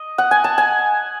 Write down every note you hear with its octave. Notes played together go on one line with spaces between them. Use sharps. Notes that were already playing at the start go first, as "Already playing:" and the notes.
Already playing: D#5
F#5
G#5
A5
G#5